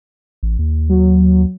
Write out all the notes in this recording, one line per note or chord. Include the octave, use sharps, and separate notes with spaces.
A1
D#2
F#3